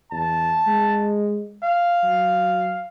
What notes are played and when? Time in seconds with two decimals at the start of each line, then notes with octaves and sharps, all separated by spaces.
0.11 E2 A5
0.67 G#3
1.64 F5
2.03 F#3